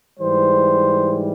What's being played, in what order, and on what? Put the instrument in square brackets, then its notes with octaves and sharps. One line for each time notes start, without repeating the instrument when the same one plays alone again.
[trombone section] G#2 E3 G3 C5